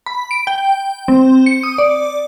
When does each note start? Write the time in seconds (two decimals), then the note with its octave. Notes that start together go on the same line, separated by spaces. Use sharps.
0.06 B5
0.31 D7
0.47 G5
1.08 C4
1.46 C#7
1.63 D#6
1.78 D5